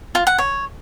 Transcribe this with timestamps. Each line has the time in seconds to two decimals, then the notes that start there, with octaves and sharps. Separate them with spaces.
0.15 F4
0.27 F#5
0.38 C#5